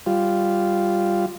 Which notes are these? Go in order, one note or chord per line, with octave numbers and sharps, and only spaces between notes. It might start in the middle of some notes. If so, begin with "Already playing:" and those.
G3 F4